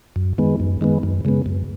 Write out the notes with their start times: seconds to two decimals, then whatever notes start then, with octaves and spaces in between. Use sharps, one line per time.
0.16 F#2
0.38 D#3 G#3 B3
0.60 F#2
0.81 D#3 G#3 B3
1.03 F#2
1.25 C#3 G#3 B3
1.46 F#2